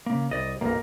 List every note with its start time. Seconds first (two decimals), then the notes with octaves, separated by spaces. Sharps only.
0.06 C#3 A#3
0.31 C2 D5 D#5
0.61 B1 F#2 A#3 A#4